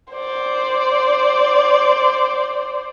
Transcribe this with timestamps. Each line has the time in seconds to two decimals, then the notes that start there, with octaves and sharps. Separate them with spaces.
0.13 C5 D5